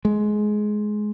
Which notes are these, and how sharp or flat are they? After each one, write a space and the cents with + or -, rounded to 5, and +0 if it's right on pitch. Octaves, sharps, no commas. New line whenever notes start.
G#3 +15